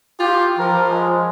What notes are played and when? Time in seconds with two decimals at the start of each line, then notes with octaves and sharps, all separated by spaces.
0.19 F4 G4
0.59 F3 A#4
0.89 G#3